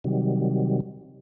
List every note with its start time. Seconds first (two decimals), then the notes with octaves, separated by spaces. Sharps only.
0.04 C3 D#3 F#3 G3